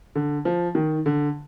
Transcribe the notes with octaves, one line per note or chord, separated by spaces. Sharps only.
D3
F3
D#3
D3